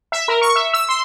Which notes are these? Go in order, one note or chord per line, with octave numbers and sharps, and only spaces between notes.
E5
A#4
C#6
E5
E6
C6